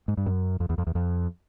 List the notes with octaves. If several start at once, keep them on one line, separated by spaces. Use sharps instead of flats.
G#2
G2
F#2
F2
E2
F2
E2
F2